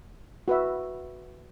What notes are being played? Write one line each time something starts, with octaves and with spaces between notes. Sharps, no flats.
F#4 B4 E5